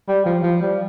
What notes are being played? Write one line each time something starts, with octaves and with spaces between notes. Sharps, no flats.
G3
F3
F3
G3